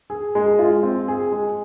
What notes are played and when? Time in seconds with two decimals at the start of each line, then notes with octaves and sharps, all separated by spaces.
0.10 G#4
0.35 G#3
0.59 F4
0.83 C4
1.08 G#4
1.32 G#3